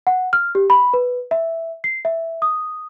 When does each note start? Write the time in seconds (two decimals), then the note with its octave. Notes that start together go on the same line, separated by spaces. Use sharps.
0.07 F#5
0.33 F6
0.55 G4
0.70 B5
0.94 B4
1.31 E5
1.84 C7
2.05 E5
2.42 D#6